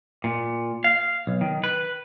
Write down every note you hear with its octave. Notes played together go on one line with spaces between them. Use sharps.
A#2
F5
B1
D#3
B4